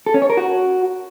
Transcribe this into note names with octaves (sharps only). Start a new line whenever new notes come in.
A4
C#4
C#5
A#4
F#4